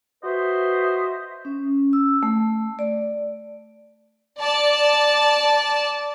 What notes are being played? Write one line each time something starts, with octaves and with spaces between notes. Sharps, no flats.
F#4 B4 C5 D#5 E5
C#4
E6
A3
D5
D5 A5